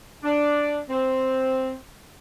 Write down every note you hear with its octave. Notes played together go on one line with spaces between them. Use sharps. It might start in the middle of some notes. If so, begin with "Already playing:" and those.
D4
C4